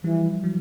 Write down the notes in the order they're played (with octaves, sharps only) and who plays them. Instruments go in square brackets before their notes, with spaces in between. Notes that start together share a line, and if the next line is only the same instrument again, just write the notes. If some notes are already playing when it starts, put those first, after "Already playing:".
[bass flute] E3 [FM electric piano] F3 G3
[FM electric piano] E3 F#3